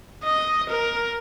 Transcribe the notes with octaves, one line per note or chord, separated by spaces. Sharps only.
D#5
A#4